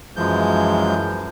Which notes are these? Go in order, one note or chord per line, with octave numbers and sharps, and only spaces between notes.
F#2 E3 F3 G#3 G6